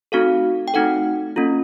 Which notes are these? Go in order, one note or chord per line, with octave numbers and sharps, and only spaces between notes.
A3 C4 D#4 F#4 A4 F5
G5
A3 C4 D#4 F#4 A4 F#5
A#3 C#4 F4 A4